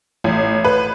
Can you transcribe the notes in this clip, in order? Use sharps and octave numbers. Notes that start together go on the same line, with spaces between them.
A1
B4